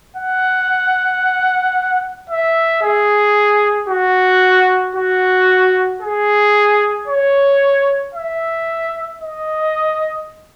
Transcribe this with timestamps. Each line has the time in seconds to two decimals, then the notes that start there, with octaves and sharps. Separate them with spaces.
0.16 F#5
2.30 E5
2.82 G#4
3.89 F#4
4.95 F#4
6.01 G#4
7.08 C#5
8.15 E5
9.20 D#5